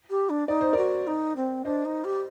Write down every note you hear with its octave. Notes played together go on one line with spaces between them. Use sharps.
G4
D4
D#4 D5
C5
F#4 A#4 D5
D#4
C4
D4 C5 D#5
D#4
G4